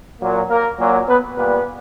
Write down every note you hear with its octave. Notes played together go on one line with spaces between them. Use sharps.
A#2 F#3 A#3
A#3 A#4
A#2 F#3 A#3
B3 B4
A#2 G3 A#3 B3 B4